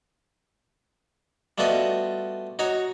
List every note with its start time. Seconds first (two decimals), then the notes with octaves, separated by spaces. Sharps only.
1.58 G3 A3 B3 F4 F#4 D#5
2.59 D#4 F#4 C#5